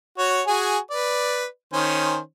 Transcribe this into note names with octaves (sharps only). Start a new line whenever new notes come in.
F#4 C#5
F#4 G#4 G#5
B4 D5
D#3 C#4 C5